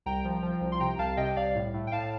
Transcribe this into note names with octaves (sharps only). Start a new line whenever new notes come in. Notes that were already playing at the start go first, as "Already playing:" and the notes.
C2 G5 A#5
F3
F3
C2
C6
C3 G5 A#5
C2 F5 A5
C3 D#5 G5
C2 D5 F5
A2
A2
G5
A2 F5 A5